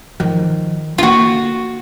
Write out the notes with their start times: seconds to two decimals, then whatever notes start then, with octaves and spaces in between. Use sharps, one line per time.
0.20 D#3 F3
0.98 D3 A#3 F4 F#4